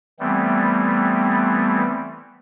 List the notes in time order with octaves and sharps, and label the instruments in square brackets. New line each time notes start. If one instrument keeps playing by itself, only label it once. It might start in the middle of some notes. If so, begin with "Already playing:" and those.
[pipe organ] E3 G3 A3 B3 C4